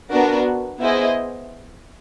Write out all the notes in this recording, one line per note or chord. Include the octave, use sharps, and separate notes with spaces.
B3 D4 F#4 A#4
B3 E4 G#4 C5 D#5